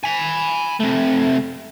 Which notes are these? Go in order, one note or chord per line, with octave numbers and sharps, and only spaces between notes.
G#5 B5
C3 A3